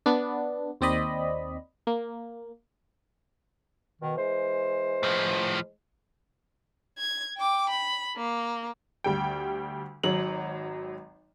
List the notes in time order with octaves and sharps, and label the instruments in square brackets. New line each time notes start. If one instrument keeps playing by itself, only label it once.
[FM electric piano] B3 D4
D#2 C4 D5 D#5 B5
A#3
[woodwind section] B2 D#3
E3 G#3 C5
[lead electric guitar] A2 F3
[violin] G#6
G5 D6
B5
A#3
[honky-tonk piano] D2 G3 G5
G#1 F#3 F#7